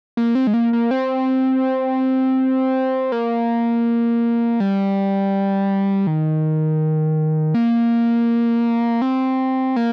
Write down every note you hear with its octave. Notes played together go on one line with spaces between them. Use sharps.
A#3
C4
G#3
A#3
A#3
C4
A#3
G3
D#3
A#3
C4
A#3